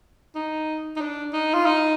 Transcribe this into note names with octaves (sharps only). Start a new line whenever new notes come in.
D#4
D#4
D4
D#4
F4
D#4